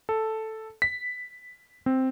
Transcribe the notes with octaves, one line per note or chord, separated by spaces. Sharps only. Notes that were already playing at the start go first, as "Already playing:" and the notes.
A4
B6
C4